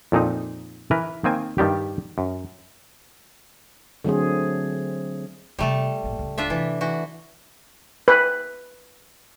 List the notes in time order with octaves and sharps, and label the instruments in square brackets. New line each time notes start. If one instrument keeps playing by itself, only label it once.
[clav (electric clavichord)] F2 A#2 C4 D#4
E3 A#4 B4
D#3 A#3 C4 G#5
G2 D#3 G3 G4
F#2
[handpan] D3 F#3 A3 C4 G#4
[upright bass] C3 E3 [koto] G3 A3 A4
[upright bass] A1 A#2
D1 C#2
[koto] D4 F4 E5
[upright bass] C3 [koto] E3
[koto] E3 F#4
[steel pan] B4